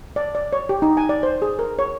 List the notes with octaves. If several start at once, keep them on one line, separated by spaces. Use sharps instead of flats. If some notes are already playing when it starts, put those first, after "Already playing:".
D5
D5
C#5
G4
D#4
G#5
D5
C5
G#4
A#4
C#5